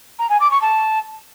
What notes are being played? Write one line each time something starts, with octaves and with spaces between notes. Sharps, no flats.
A#5
G#5
D6
C#6
A5